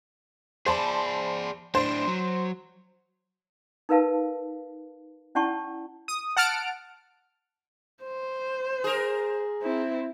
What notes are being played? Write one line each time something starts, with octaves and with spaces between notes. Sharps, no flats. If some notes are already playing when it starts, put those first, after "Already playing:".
G#4 C5 D5 A5 B5
A2 D4 C5
F#3
D#4 A#4 B4 F5 A5
C#4 E4 D5 F#5 A5 C#6
D#6
F#5 A5 F6 D7
C5
G#4 A#4
C4 E4